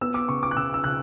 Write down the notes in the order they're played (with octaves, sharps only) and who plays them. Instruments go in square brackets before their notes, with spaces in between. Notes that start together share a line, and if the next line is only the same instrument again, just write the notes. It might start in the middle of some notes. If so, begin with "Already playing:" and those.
[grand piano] B3 E6
D6
C#3 C#6
D6
F#6
C#3 E6
E6
C#3 F#6